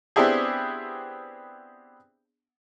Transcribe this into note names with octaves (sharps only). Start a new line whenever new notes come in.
B3 C4 D4 E4 G4 G#4